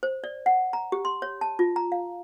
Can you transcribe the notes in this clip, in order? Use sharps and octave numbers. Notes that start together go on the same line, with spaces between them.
C5
D5
F#5
A#5
G4
C6
C#5
A5
F4
A#5
F5